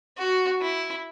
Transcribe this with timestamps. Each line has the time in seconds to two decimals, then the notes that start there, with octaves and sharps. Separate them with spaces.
0.17 F#4
0.61 E4